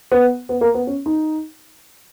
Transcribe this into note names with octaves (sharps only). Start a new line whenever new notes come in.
B3
B3
A#3
B3
C#4
D#4